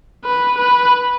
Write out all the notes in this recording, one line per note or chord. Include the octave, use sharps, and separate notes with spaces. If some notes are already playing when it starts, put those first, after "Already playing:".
B4
B4